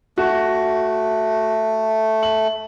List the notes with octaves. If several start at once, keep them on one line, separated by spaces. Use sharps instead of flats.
A3 F#4
F#7